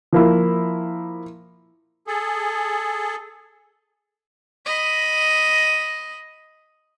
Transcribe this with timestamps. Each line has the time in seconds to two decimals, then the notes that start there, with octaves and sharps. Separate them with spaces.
0.13 F3 A#3 E4
2.07 G#4 A4
4.66 D#5 B5